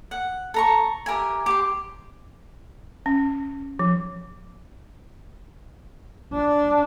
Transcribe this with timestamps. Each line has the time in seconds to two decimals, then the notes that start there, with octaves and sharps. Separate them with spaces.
0.11 F#5
0.54 A4 A#5 C#6
1.06 G4 A#4 E5 G#5
1.46 G4 C6
3.06 C#4
3.79 F3
6.33 D4